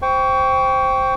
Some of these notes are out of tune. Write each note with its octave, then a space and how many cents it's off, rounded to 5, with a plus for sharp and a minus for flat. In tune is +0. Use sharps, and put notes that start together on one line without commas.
C5 +0 G5 +0 C#6 +25